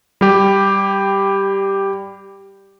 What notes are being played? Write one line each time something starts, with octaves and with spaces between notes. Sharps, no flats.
G3 G4